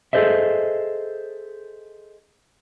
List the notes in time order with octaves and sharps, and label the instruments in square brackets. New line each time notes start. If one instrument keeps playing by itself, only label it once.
[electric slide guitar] G#4 A4 C5 D#5 E5